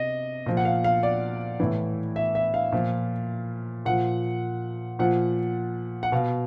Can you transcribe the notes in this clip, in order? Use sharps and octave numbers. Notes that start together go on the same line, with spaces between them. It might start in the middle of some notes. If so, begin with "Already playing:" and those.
Already playing: C3 D#5
A#2 F3
F#5
F5
F5
D5
A2 E3
E5
E5
F5
A#2 F3
A#2 F3 F#5
A#2 F3 F#5
F#5
B2 F5